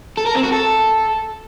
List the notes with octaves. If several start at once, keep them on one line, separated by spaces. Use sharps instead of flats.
A4
A#4
C4
F#4
A4